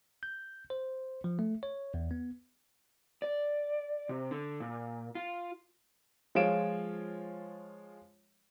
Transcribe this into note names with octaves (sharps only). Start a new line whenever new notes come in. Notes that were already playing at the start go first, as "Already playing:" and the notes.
G6
C5
F3
A3
C#5
E2
B3
D5
C3
D3
A#2
F4
F3 G#3 F4 C#5 D7 E7